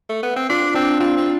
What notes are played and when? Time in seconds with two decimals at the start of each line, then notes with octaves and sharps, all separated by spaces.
0.09 A3
0.23 B3
0.36 C4
0.49 D4 F4
0.74 C4 D4
1.00 C4 F4
1.17 C4